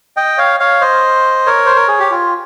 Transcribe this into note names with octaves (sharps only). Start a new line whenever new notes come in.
D#5 G5
C#5 F5
C#5 F5
C5 D#5
A#4 C#5
C5
A#4
G#4
G4
F4